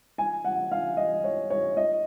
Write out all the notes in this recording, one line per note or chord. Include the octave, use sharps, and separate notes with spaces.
G#5
F#5
F5
D#5
C#5
C#5
D#5